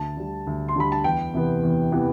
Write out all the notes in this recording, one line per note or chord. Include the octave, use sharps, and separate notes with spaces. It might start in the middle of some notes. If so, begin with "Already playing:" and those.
Already playing: D2 A5
D3 G3
D2
C6
D3 G3 B5
A5
E2 G5
C3 E3 B3
E2
C3 E3 B3